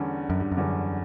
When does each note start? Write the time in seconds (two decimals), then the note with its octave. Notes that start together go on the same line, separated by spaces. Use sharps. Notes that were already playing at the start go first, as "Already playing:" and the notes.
Already playing: E2 D3 G3 C#4
0.30 F#2
0.40 G2
0.52 F#2
0.57 E2 D3 G3 C#4